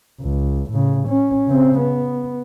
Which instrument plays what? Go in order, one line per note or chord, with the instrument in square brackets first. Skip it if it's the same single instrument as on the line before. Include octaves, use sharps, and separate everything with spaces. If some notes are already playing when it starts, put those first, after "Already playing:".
[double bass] C#2
A2 C#3
C#4
C#3 C4
B3